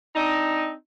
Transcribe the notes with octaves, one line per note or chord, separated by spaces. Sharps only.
C4 D4 D#4